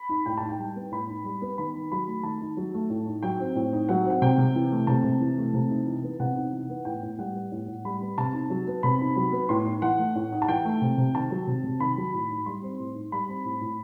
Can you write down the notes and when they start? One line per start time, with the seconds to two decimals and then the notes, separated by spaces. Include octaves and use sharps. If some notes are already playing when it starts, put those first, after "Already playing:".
Already playing: B5
0.09 D#4
0.26 A2 G5
0.38 A5
0.43 D#4
0.49 G5
0.59 G3
0.76 B3
0.92 A2 B5
1.08 D#4
1.25 G3
1.42 B3
1.58 D#3 B5
1.74 D#4
1.91 F#3 B5
2.07 A3
2.23 D#3 A5
2.41 D#4
2.57 F#3
2.74 A3
2.90 A2
3.07 D#4
3.23 F#3 G5
3.40 C4
3.56 A2
3.73 D#4
3.89 F#3 F#5
4.05 C4 F#5
4.22 C3 G5
4.38 C3
4.55 E3
4.72 A3
4.87 C3 A5
5.04 C3
5.21 E3
5.38 A3
5.54 C3
5.70 D#4
5.86 E3
6.03 B3
6.20 C3 F#5
6.36 D#4
6.52 E3
6.70 B3
6.85 A2 G5
7.03 A2
7.19 G3 F#5
7.35 B3
7.52 A2
7.68 A2
7.85 G3 B5
8.02 B3
8.18 C3 A5
8.33 D#4
8.50 F#3
8.67 B3
8.83 C3 B5
9.01 D#4
9.16 F#3
9.32 B3
9.49 A2 C6
9.66 D#4
9.82 E3 F#5
9.98 A3
10.16 A2
10.32 D#4
10.42 A5
10.48 E3 G5
10.65 A3
10.82 C3
10.98 C3
11.15 D#3 A5
11.31 F#3
11.47 C3
11.64 C3
11.80 D#3 B5
11.97 F#3
12.13 A2
12.30 D#4
12.46 G3 C6
12.63 C4
12.79 A2
12.95 D#4
13.12 G3 B5
13.29 C4
13.45 A2
13.61 A2